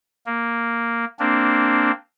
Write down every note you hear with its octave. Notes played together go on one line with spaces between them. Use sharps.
A#3
A#3 C4 D4